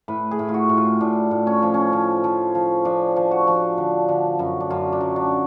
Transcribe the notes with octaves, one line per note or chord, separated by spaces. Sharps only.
A2 B4
G#4
A2
F4
F#4
A2
F4
A2 D4
A2
C#4
F3
C#4
F3
F3
F3
F3 D4
F3
F#4
F3
D3
D3
F#2
D4
F#2 F4
D4
F#3
D4